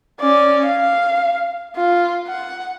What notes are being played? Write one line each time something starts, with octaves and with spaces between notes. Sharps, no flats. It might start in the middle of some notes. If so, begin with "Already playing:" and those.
C#4 D5
F5
F4
F#5